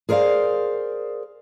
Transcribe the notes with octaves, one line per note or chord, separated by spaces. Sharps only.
G#4 A#4 C5 D5 F5